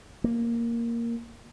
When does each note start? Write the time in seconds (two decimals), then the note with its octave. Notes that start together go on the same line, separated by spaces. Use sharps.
0.24 A#3